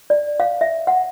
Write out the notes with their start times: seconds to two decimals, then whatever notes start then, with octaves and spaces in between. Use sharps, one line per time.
0.10 D5
0.40 F5
0.61 E5
0.87 F#5